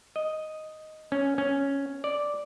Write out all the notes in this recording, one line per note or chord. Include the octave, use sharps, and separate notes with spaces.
D#5
C#4
C#4
D5